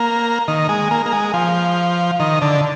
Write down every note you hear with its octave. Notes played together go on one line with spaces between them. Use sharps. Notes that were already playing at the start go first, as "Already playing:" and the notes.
Already playing: A#3
D#3
G#3
A#3
A#3
G#3
F3
D#3
D3